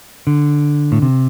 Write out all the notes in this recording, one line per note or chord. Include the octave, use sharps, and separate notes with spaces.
D3
A2
C3